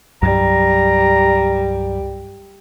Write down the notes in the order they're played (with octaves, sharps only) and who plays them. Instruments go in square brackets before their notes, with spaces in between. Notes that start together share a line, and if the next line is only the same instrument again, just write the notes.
[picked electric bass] C2 G2 F#3 [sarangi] G3 [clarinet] A#5